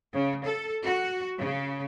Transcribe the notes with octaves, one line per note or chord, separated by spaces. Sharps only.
C#3
A4
F#4
C#3